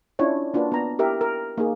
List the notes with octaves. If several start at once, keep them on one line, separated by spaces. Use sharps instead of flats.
C#4 D4 E4 F4 C#5
A#3 D4 F4 F#4 B4
B3 A#5
E4 G4 A#4 E5
A#4
A#3 D#4 G#4